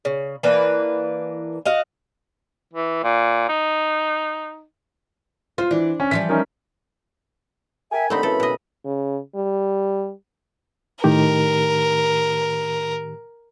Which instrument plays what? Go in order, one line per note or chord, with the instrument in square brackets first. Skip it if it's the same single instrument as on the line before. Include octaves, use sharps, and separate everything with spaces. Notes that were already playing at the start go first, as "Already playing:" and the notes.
[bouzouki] C#3
E3 A#3 D4 B4
F#4 D#5 F5
[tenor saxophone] E3
A#2
D#4
[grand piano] F4 [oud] C5
[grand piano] E3 [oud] D4
[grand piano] C#4
[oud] E3 F3 G3 [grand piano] B6
[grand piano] C#4 D#4 A#4
[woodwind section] A#4 G5 G#5 [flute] E5
[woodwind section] D#2 D3 [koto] A3 C4 D#4 [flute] B5
[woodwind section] F#2 C#3 E3 [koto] A4
[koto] B2 D#5
[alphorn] C#3
G3
[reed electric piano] A2 D#3 G4 [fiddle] A#4